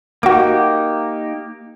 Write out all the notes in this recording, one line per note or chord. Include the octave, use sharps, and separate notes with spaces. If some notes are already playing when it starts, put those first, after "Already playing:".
A#3 D#4 F#4 G4 D6